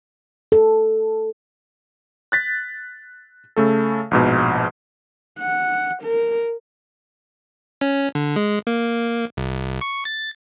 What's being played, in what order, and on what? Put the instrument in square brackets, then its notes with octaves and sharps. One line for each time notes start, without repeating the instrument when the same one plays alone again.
[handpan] A4
[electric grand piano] F#6 A6 B6
C#3 A3 A4
A#1 G#2 B2
[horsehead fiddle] F#5
A#4
[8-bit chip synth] C#4
D3
G#3
A#3
C2
C#6
A6